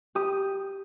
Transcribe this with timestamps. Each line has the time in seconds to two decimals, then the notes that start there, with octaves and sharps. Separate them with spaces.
0.15 G4 D#6